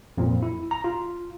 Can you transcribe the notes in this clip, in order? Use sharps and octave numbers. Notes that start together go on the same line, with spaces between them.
F2 A#2
E4
A#5
F4